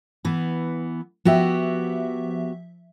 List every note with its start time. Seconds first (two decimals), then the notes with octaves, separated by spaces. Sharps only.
0.25 E3 B3
1.25 F3 B3 F#4 G4 E5